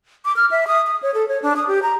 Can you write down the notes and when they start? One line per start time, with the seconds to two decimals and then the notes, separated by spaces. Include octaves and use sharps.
0.25 D6
0.36 F6
0.51 E5
0.67 D#6
0.87 D#6
1.03 C#5
1.14 A4
1.28 C#5
1.42 D4
1.56 D#6
1.68 G4
1.82 A#5